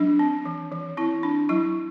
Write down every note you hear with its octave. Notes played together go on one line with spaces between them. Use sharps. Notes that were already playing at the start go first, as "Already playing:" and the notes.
Already playing: F#3 D4
C4
E3
E3
C4 E4
C4 D4
F#3 E4